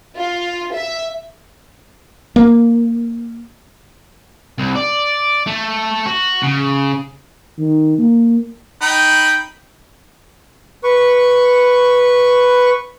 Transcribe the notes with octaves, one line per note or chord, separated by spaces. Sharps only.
F4
E5
A#3
C2
D5
A3
F#4
C#3
D#3
A#3
D#4 G5 B5
B4 C#6